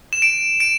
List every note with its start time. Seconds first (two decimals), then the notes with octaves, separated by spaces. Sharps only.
0.13 E7
0.22 D7
0.60 D7